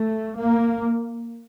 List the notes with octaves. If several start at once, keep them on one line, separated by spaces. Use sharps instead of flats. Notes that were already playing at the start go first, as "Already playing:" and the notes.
Already playing: A3
A#3